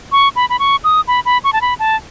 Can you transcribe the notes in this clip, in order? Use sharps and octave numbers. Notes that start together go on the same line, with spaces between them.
C#6
B5
B5
C#6
D#6
B5
B5
C#6
A5
B5
A5